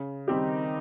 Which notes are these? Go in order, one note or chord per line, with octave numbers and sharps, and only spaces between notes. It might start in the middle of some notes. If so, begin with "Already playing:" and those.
Already playing: C#3
D#3 G3 C4 D#4 G4